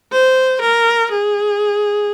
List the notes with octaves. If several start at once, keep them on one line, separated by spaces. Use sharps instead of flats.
C5
A#4
G#4